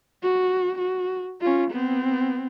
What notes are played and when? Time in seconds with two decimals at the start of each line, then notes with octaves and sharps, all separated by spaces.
0.22 F#4
0.78 F#4
1.41 C#4 F4
1.71 B3 C4